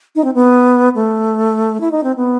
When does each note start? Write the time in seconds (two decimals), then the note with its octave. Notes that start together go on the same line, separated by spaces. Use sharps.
0.15 D#4
0.24 C4
0.34 B3
0.95 A3
1.80 E4
1.91 D#4
2.03 C4
2.16 B3